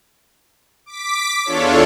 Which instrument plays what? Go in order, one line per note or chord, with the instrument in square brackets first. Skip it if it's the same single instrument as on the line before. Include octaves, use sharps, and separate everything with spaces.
[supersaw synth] D6 B6
E2 D4 F4 A4 C#5